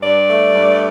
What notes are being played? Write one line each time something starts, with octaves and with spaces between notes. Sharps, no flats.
G2 D5
A3
G2